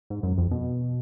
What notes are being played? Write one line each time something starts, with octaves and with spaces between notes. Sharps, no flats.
G#2
F#2
F2
B2